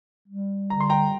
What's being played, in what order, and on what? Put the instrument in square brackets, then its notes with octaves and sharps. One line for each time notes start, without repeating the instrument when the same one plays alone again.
[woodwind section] G3
[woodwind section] D3 [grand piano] A#5
[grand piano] C6
G5 A#5